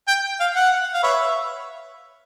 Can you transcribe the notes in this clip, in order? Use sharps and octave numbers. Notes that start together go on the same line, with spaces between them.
G5
F5
F#5
F5
B4 C#5 E5